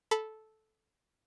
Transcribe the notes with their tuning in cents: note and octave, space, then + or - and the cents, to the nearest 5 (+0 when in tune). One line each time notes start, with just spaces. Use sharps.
A4 -10 B5 -5